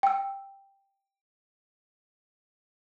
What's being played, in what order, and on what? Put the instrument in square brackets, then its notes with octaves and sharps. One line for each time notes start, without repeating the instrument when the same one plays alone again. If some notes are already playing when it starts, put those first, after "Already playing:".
[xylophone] G5 E6